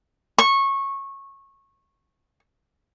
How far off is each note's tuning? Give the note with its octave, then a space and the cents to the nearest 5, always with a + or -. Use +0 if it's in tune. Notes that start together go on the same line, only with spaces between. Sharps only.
C#6 -20